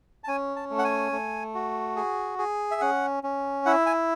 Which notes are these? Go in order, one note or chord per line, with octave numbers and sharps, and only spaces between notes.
A5
C#4 G#5
A5
A3
F#5
G#5
A3
F#4
G#4
G#4
E5
C#4 F#5
C#4
E4 F#5
G#5